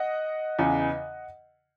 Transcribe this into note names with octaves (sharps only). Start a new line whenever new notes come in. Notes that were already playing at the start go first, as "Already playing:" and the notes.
Already playing: D#5 F#5
E2 C#3 E3